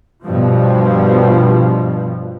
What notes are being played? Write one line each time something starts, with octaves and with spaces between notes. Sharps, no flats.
G2 B2 F3